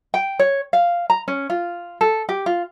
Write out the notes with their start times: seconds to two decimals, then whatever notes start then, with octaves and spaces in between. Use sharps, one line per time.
0.14 G5
0.39 C#5
0.73 F5
1.10 A#5
1.28 C#4
1.50 F4
2.01 A4
2.29 G4
2.46 F4